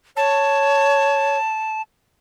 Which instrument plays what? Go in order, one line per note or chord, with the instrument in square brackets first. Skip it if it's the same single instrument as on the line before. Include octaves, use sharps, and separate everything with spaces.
[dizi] C#5 [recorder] A5